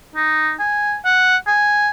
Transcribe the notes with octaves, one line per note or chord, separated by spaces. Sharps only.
D#4
G#5
F#5
G#5